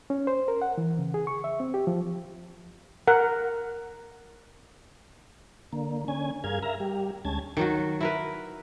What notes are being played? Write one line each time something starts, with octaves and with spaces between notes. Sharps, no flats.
C#4
C5
A#4
F#5
E3
C#3
G#4
C#6
E5
C4
G4
F3
A#4 F#5
D3 A#3
D3 C#4 G#5
G2 G#4 A#4 F5 G#6
A#4 E5 F5 A#5
G3 G4
D2 G#3 C#4 A5 G#6
D#3 F#3 F#4
E4 A#4 B4